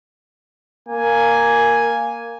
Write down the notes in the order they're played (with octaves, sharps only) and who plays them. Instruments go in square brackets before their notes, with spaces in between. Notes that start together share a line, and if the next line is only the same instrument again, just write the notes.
[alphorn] A#3 [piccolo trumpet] G#5